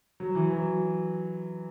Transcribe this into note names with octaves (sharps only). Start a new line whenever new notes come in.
F#3
E3
F#3